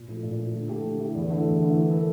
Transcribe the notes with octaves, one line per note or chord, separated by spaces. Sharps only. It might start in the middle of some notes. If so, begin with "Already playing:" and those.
Already playing: A#2
F3 A3
A#2
F3 A3
D3
A3 E4 G4
D3
A3 E4 G4
E2
D3 A3 E4
E2
D3 A3 E4
E3
A#3 E4 A4